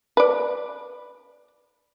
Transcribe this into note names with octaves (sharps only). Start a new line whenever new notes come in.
B4 D5